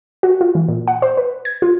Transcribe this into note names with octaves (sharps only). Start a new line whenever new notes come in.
F#4
F4
E3
A#2
F#5
C5
B4
G#6
F4